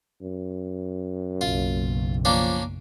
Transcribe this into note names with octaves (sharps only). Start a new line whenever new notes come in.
F#2
F#1 B1 F4
F3 A#3 C#4 D4